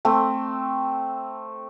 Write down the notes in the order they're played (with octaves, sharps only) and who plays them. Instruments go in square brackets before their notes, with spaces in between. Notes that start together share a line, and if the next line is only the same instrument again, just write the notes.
[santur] A3 C4